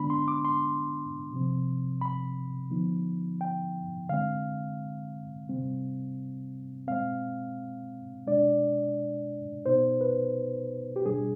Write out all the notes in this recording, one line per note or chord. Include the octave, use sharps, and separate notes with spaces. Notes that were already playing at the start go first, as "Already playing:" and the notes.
Already playing: D3 G#3 B3 D4 B5
C6
D6
C6
C3 F3 C4
B5
D3 F3 B3 D#4
G5
D3 G#3 C4 F5
C3 G3 C4
B2 G#3 C4 F5
B2 G#3 D4 D5
B2 B3 D#4 C5
B4
G4
B2 G3 D4 G#4